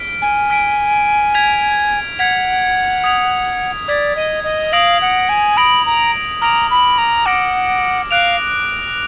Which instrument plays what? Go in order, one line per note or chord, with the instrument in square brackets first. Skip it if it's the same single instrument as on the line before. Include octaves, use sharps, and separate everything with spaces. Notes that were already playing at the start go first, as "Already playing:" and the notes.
Already playing: [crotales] F6 B6 D7
[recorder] G#5
[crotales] F6 B6 D7
G#6 B6 F7
[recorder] F#5 [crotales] G#6 B6 F7
[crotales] D#6 G#6 B6 F7
[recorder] D5 [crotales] D#6 G#6 B6 F7
[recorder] D#5
D#5
[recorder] F5 [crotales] D#6 A#6 D7 F#7
[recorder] F#5
G#5
[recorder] B5 [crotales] D#6 A#6 D7 F#7
[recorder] A#5
[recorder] A#5 [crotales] D6 F6 A#6 D7
[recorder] B5
A#5
[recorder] F#5 [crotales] D6 F6 A#6 D7
[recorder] F5 [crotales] F#6 D7 F7